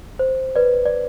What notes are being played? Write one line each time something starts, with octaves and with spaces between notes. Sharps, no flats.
C5
B4 D5
D5